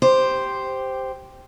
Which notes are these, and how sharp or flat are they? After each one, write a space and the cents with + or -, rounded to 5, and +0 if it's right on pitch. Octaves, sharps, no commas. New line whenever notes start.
G4 +0 C5 +0